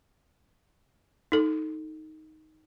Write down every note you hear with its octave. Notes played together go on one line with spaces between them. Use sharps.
D#4 A4